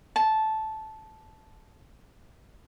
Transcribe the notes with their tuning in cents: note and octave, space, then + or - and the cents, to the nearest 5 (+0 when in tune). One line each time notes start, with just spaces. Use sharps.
A5 -10